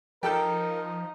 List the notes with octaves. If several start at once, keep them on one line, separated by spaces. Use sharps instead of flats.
F3 D#4 G4 A4 A#4 G5